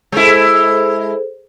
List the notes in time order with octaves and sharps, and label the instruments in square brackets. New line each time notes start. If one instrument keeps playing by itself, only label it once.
[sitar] G#3 E4 [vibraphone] G#4 A4 C5